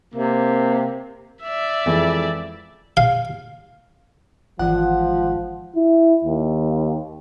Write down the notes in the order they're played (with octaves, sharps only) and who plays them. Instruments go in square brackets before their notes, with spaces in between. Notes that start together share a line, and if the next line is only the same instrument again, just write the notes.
[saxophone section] C3 A#3
[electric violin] D5 E5
[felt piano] F2 E3 G#3
[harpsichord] F5
[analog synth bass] G#1 [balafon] E3 F4 [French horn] F3 [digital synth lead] F#5
[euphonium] E4
D#2